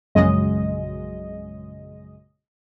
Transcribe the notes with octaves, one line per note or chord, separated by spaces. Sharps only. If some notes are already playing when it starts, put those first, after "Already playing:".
A#1 F#2 C#3 F#3 G#3 D#5